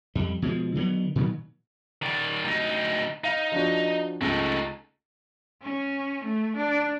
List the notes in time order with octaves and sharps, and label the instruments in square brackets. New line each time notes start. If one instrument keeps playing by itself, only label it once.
[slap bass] F2 G3
B2 F3 G3 G#3
D3 D#3 F#3 B3
A#2 D#3 F#3
[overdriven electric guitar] D#3 D5
D2 D#4
[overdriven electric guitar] D#4 [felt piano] F5
[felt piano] F3 D4 F#4
[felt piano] C#2 [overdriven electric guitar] A3 D#4
[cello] C#4
A3
D4